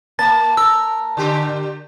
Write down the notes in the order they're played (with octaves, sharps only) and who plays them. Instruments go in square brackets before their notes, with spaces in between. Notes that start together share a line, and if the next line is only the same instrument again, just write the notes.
[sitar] A#3 [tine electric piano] A5 [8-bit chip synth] A6
[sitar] A#4 [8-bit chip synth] E6
[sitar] D3 G4